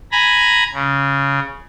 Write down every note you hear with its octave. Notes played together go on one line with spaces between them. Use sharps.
G#5 A#5 B5
C#3